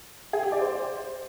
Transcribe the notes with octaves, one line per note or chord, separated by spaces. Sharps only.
G#4
G4
D5
C5